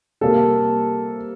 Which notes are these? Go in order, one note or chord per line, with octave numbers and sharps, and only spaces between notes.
C3 G3 A#3 A4